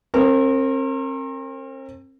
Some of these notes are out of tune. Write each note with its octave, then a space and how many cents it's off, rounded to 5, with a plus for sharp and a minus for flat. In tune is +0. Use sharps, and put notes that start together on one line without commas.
C4 +40 A#4 -25